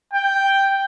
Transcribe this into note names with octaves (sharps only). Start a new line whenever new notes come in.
G5